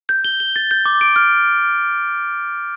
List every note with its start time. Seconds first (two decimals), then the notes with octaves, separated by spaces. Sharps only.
0.09 G6
0.24 G7
0.40 G7
0.56 A6
0.71 G6
0.86 D6
1.01 D7
1.16 F6